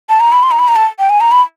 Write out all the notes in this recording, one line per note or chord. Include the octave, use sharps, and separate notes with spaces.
A5
A#5
B5
C6
A#5
B5
A#5
A5
G5
G#5
A#5
B5